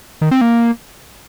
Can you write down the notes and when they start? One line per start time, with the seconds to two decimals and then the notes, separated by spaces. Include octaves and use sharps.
0.21 D#3
0.31 C4
0.41 A#3